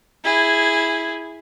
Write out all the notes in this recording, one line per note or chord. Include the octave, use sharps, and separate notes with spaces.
E4 G#4